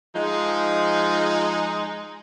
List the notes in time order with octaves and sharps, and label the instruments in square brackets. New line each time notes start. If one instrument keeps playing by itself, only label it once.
[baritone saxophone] F3 [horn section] G#3 D#4